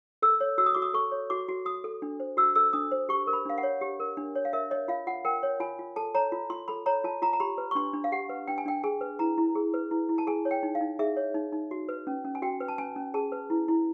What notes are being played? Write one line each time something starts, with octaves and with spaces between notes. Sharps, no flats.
A4 E6
C#5
F#4 E6
D#6
F#4 D6
D#6
A4 C#6
C#5
F#4 D6
F#4
F#4 D#6
A4
D4
C5
F#4 E6
A4 E6
D4 D#6
C5
G4 C#6
A#4
B5
D4 F5
F#5
C#5
G4
A#4
D4
C#5
F5
A#4 E5
C#5 D#5
F4 F5
F4 F#5
A#4 G5
C#5
F4 G#5
F4
A4 A5
C#5 A#5
F4
F4 C6
A4 B5
C#5 A#5
F4 A5
F4 A#5
A#5
G4 B5
B4
C#6
D4 C6
D4
F5
G4 F#5
B4
D4 G5
G#5
D4 G5
G#4 G#5
B4
E4 A#5
E4
G#4
B4
E4
E4
A5
G#4 G#5
C#5
G5
D#4
F5
D#4
G#4 E5
C#5
D#4
D#4
F#4
B4
C#4
C#4
G#5
F#4 G5
B4
A5
C#4 G#5
C#4
G#4 A5
B4
E4
E4